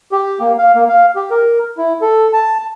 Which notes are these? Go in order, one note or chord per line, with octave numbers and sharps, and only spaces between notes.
G4
A#3
F5
A#3
F5
G4
A#4
E4
A4
A5